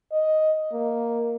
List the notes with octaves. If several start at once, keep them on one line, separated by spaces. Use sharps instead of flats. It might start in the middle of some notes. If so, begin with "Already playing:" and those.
D#5
A#3